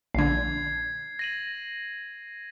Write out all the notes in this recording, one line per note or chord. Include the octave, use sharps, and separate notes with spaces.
A#1 D3 G#6 C7
A#6 D#7 F#7